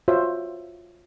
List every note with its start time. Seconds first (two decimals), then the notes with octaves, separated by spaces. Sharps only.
0.08 F4 F#4 C5 C#5 E5